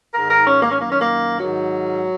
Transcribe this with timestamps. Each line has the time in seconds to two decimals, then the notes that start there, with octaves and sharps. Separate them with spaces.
0.15 G#2 D#3 A#4
0.31 A#4
0.47 C#4
0.62 A#3
0.72 C#4
0.78 F#2 D#3 A#3
0.91 C#4
1.02 A#3
1.40 G#2 D#3 F#3